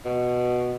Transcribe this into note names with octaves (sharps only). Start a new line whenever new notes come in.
B2